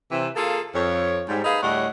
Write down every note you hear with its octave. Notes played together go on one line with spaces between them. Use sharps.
C3 E3
A#3 F4 G#4 A4
F2 C#5
G#2 G3
A#3 D#4 G#4 B4 F5
D2 A2 G3 C#5 D#5 F#5